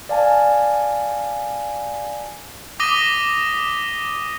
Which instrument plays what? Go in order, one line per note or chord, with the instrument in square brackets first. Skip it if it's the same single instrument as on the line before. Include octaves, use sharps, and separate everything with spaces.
[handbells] D5 F5 G#5 A5
[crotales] D6 D#6 A#6 B6 D#7 G7